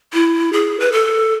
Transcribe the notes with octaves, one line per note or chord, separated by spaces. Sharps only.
E4
G#4
B4
A4